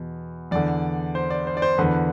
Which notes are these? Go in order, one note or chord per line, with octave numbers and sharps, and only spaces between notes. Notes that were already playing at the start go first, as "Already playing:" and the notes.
Already playing: E2 B2
E2 D3 D5
C5
D5
C5
D5
C5
E2 D3 B4